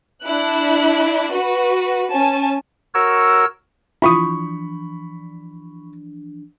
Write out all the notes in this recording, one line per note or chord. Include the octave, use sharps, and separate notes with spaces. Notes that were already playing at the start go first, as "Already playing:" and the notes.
D4 E4 F#6
F#4 B4
C#4 G#5 A5
F#4 A#4 C#5 E6
E3 F3 D4 E4 F4 B5 C#6 D#6